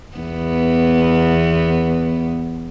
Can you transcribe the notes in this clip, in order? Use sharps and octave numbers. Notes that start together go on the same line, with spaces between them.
E2 B3